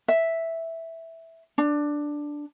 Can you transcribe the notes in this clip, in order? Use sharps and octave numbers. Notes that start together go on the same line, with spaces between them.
E5
D4